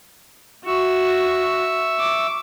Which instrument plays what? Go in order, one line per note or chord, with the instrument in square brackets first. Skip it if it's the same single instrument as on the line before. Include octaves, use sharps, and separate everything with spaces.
[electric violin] F#4 [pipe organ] E5 C#6 E6
[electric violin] D6